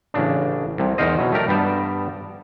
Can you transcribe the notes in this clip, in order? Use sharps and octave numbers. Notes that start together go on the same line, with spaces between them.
A1 C#3 D4
C2 C3
E2 D#4 A#4 C5 D#5
B2 F#3
A3 G4 A#4 D5
G2 G3 B3 G5 A5